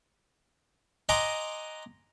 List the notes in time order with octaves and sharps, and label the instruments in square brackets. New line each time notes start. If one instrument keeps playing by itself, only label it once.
[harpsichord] D#5 F#5 G#5 A#5 C6 D6